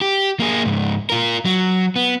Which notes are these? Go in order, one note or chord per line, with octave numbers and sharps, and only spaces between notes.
G4
A#3 G#4
C#2 G#2
F4 A#4
F#3
B3